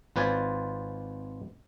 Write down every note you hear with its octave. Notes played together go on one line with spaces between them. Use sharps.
G#1 F4 B4 C5 D5 G#5